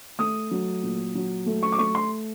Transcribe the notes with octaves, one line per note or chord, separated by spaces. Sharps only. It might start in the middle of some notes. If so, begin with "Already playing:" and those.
A3 D#6
F#3
A#2
F#3
A3
C#6
D6
A3 C#6
C6